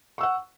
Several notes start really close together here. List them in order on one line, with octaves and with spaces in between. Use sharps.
C#6 E6 F#5